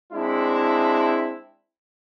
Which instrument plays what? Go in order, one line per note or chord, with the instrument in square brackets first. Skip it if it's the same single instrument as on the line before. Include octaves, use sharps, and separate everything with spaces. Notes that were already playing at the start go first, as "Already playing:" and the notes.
[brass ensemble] G#3 C4 D4 E4